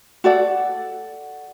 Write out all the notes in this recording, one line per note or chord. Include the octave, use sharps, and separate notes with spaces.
F#4 A4 D5 F#5